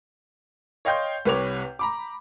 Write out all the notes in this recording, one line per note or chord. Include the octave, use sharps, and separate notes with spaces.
C#5 D#5 F5 G5 C6 G6
C2 C3 B4 C#5 D6 F7
A#5 B5 D6